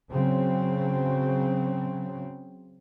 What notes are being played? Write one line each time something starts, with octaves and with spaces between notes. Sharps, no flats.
C#3 F#3 C4